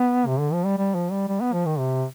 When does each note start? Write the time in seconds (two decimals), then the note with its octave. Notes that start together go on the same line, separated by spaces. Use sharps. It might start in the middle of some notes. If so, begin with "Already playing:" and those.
Already playing: B3
0.27 C3
0.40 D3
0.53 F3
0.66 G3
0.78 G3
0.95 F3
1.12 G3
1.28 G3
1.41 B3
1.53 F3
1.66 D#3
1.79 C3